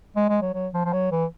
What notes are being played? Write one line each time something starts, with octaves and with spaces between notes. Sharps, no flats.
G#3
G#3
F#3
F#3
F3
F3
F#3
E3